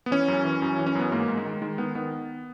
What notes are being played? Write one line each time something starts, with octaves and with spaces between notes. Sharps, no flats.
B3
E3 C#4
F#2
E3
F#2
E3
C#4
F#2 B3
G#2 A#3
G#2
G#3
D#3
D#3 G#3
D#3 B3
D#3 B3